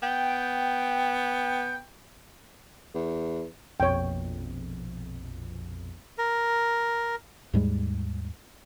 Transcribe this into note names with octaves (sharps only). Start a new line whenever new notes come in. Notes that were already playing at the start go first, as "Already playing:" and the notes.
B3 G5
E2
A#1 F2 B2 C#5 G5
A#4
D#2 G#2 G3 G#3